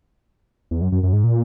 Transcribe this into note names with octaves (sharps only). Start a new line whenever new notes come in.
E2
F#2
F#2
F#2
G#2
A#2